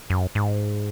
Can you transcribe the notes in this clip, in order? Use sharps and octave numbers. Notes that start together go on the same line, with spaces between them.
F#2
G#2